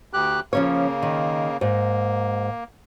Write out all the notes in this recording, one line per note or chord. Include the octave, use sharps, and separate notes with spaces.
D2 G4 F#6
C#3 F3 A#3 C#4 C#5
D#3
G#2 A#3